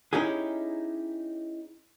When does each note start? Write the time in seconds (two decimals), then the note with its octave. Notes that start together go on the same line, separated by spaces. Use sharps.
0.13 C#4 D#4 E4 G4 G#4